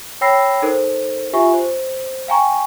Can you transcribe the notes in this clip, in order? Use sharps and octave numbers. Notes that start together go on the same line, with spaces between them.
C#5 G5 B5 E6 A#6 C7
D#4 A4 A#4 C5
F4 G4 E5 G#5 C#6
C5
F5 G5 G#5 A#5 C#6